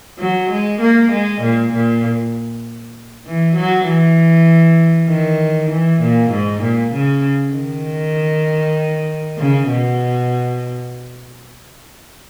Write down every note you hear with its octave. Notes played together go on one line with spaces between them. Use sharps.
F#3
G#3
A#3
G#3
A#2
A#2
E3
F#3
E3
D#3
E3
A#2
G#2
A#2
C#3
D#3
C#3
B2